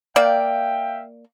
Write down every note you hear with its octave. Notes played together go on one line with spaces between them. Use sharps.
A#3 D5 E5 F5 G5